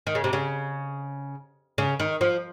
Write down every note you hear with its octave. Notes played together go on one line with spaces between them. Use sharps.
D#3
C#3
C3
C#3
C#3
D#3
F3